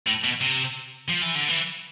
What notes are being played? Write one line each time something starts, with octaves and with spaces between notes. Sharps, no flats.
A2
B2
C3
F3
E3
D3
E3